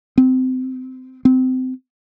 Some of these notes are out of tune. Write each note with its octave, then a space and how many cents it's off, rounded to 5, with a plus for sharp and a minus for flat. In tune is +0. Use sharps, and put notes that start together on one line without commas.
C4 -25
C4 -25